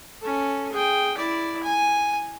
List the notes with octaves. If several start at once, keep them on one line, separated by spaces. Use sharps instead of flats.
C#4 A4
G#4 G5
E4 D5
G#5